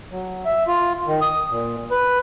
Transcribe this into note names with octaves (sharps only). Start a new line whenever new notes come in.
F#3
E5
F4
D#3
D#6
A#2
B4